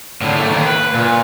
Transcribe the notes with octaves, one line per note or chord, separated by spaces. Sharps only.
A2 D3
A3 A#3
D#2 D#3
B4
A#2